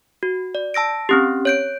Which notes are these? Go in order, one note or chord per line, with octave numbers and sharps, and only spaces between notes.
F#4
D5
A5 E6 A#6 D7
C4 C#4 G4
C#5 G6 D7